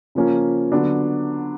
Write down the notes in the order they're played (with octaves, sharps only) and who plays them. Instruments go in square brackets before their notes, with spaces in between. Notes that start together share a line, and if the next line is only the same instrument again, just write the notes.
[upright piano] C#3 F3 A#3 C#4
D3 F#3 B3 D4